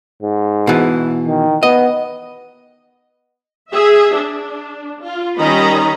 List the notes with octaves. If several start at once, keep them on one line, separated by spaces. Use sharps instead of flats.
G#2
B2 E3
D#3
B3 D#5
G#4 E5
D4
F4
D#3 G3 C#4 D#5 A#5 B5